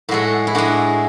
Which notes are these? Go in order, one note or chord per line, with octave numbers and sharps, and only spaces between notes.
A2 G#3 F#4 A4
E4
A2 G#3 D4 F#4